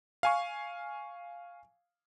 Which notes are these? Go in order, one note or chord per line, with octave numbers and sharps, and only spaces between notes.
F5 G#5 C#6